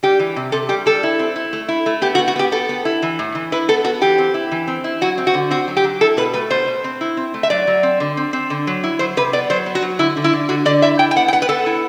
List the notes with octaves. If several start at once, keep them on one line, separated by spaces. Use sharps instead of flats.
G3 G4
E3
C3
C3 A4
G3 G4
G3 A4
E4
C4
E4
A3
E4
A3
B3 G4
F#4
B3
F#4
B3 G4
B3 A4
B3
E4
E3
A2
E3
E4 B4
B3 A4
B3 F#4
E3 G4
C4
E4
E3
C4
E4
F#3 F#4
C4
F#4
D3
C4 F#4
F#3
G4
F#3
E4 A4
B2 B4
A3 B4
B2 C5
B2
C4
E4
C4
A3
E5
F#3 D5
F#3
C4
D3
C4
C4
D3
F#3
E4
F#3 C5
C3 B4
B3 D5
F#3 C5
B3
F#4
F#3
D3 E4
D3
E4
D3
D3 F#4
D3 D5
E4 E5
E4 G5
G5
B3 F#5
G5
B3 F#5
B4
B3 A4
E4